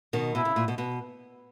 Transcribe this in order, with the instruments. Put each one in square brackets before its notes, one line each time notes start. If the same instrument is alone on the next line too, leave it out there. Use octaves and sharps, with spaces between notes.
[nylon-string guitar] B2 D#3
[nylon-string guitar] B2 [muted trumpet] E4
[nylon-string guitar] C#3
A#2
B2
B2